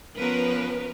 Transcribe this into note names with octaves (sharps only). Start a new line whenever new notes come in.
F3 B3 C#4 A#4 B4